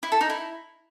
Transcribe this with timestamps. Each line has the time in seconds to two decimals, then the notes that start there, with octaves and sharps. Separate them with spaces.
0.03 E4
0.12 A4
0.21 D#4
0.30 E4